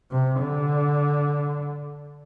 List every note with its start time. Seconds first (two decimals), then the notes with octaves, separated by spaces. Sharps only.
0.11 C3
0.40 D3